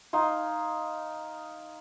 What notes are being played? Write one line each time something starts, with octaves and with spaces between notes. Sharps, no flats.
D#4 F5 G#5 C6